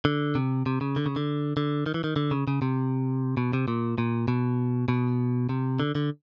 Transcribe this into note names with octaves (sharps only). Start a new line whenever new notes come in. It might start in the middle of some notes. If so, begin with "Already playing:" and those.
D3
C3
C3
C#3
D3
C#3
D3
D3
D#3
E3
D#3
D3
C#3
C#3
C3
B2
C3
A#2
A#2
B2
B2
C3
D3
D3